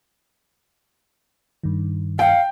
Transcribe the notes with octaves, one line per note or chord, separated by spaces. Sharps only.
G2 D#3
F5 G5